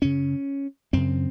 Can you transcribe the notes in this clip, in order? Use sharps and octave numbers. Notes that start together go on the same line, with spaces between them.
F#2 C#3 C#4
F#2 C#3 C4